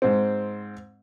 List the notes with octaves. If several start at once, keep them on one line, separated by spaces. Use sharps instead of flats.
G#2 C4